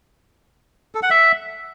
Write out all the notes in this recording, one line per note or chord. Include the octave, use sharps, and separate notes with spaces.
A4
F#5
E5